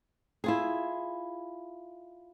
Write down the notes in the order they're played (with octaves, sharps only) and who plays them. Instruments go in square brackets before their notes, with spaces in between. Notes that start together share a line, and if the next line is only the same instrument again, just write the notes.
[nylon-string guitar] E4 F4 G#4